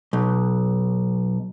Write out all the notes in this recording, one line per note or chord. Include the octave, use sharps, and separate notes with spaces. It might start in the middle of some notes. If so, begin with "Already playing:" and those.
B1